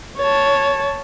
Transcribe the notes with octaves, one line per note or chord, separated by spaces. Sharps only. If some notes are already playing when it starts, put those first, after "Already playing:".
C#5 A5